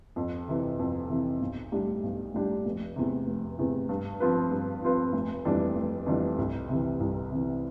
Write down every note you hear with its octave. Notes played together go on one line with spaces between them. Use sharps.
F2
C3 E3
F2
C3 E3
B1
A2 G3 D4 G4
B1
A2 G3 D4 G4
F1
E2 C3
F1
E2 C3
G2
F3 C4 F4 B4
G2
F3 C4 F4 B4
F1
F2 E3 G3 D4
F1
F2 E3 G3 D4
C2
C3 E3
C2
C3 E3